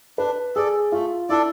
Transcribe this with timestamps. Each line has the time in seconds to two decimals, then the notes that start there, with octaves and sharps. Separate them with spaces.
0.18 D4 B4
0.56 G#4 A4 D5
0.92 A3 F4
1.29 D4 E4 A4 D5